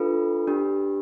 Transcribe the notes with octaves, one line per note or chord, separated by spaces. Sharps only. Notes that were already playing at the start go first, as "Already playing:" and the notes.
Already playing: D4 F4 A4 B4
D4 G4